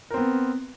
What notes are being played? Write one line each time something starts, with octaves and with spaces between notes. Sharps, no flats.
B3 C4 A#4